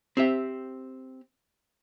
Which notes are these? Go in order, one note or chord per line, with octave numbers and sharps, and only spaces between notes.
C4 G4 E5